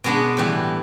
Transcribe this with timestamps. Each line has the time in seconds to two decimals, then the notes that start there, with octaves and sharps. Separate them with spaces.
0.04 B2 G#3 B3 D4
0.37 A2 E3 G3